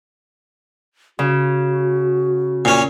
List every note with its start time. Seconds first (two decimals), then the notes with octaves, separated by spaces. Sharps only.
1.19 C#3 F#4
2.65 A#2 C#4